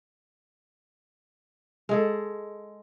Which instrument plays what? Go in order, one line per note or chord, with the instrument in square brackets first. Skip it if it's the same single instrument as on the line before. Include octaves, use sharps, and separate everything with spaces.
[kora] G#3 G#4 A4